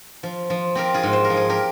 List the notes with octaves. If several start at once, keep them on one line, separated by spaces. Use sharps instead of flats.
F3
F3
C4 G4 A#4
F4 G#4
G#2
C5
A#4
F3
G#4
G4 A#4